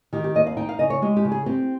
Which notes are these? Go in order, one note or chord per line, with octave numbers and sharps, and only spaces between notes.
D#3 G4
G4
D#2 D#5
F5
D#4 G5
F5
C#3 D#5
C#5
G#3 G4
G4
C#3
G#4
C4 G4